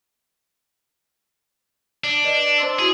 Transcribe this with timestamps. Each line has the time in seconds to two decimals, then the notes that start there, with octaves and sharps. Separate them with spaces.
2.04 D4
2.24 B4 D5 D#5
2.58 C5 C6 E6
2.79 E4 F#4 G#4